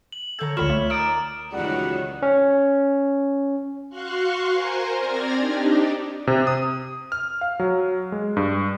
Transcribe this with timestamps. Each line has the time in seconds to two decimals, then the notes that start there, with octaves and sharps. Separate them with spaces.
0.12 F#7
0.39 D3 A4 C#5 A#5 G6
0.57 C#2 D3 F4 C#5 D5 B5 F6 E7
0.70 A3
0.90 D#4 A#4 D6 D#6 A6 D7 E7
1.53 C#2 D#3 E3 F#3 G3 F#4 F#5
2.22 C#4
3.89 F#4 F5 C6 C#6 F#6
4.50 A#4 C5 G#5 A#5 C6
4.96 C4 D5 F6 G#6 A#6
5.36 D4 D#4 G4
6.27 C3
6.47 D#6
7.12 F6
7.41 F5
7.60 F#3
8.12 G#3
8.37 G2